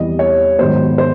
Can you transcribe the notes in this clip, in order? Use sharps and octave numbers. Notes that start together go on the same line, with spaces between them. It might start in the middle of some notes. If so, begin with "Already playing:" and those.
Already playing: E2 C3 E3 G3 D#5
C#5
G#2 D#3 F#3 B3 C5
C5